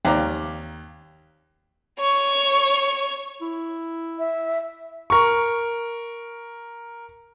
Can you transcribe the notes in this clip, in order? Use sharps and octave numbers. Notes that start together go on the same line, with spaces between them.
D#2 D5 F5 A#5 D6
C#5 C#6
E4
E5
A#4 C#6